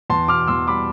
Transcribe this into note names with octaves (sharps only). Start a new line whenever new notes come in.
E2 A5 C6
B2 D6 F6
E2 C6 E6
G3 B5 D6